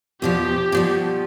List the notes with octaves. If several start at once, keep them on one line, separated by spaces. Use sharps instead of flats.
E2 B2 F3 G4
B2 F3 G3